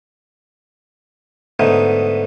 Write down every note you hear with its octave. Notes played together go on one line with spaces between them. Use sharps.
G#2 D3 A3 B3 D#4